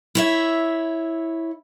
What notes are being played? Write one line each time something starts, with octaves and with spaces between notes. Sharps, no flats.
E4 C#5 E5